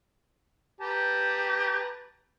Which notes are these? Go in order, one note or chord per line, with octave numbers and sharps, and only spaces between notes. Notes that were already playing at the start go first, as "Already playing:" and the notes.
G4 B4 A5 A#5